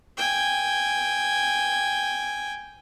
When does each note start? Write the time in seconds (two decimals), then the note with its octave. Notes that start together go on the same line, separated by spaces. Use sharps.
0.18 G5 G#5